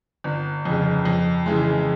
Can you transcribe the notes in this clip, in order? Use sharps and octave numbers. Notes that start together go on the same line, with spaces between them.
G1
F2 C#3
F2
C#3 E3 G#3